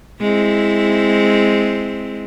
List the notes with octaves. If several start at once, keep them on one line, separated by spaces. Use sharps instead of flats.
G#3 C4 E4